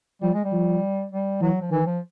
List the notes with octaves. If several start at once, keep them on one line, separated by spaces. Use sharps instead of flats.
F3 G3
G#3
G3
F3
G3
E3 F#3
F3
D#3 E3
F3